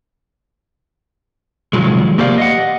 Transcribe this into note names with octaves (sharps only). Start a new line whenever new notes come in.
C3 D#3 F3 F#3 G#3
A#3 G4 C5 D5 F5
D#5 F#5